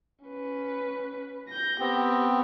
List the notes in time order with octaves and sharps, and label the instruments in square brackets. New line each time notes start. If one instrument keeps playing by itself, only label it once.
[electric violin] C#4 B4
G6 A#6
[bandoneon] B3 C4 [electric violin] G4